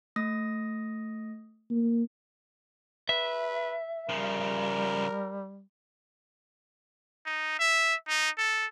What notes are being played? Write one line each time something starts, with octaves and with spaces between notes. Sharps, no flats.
A3 D#6 A#6
A#3
B4 E5
C#3 F3 G3 A#4
D#4
E5
D#4
A4